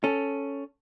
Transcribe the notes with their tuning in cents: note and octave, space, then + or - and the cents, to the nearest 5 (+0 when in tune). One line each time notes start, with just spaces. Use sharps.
C#4 +0 A4 +0